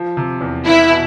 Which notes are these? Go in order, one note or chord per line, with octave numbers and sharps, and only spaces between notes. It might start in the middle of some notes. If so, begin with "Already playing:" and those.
Already playing: F3
C3
E2
B3 E4
B2